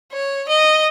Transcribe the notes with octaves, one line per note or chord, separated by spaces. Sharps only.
C#5
D#5